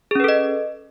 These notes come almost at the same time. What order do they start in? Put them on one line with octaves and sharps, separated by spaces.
G#4 C#4 B4 A4 D#5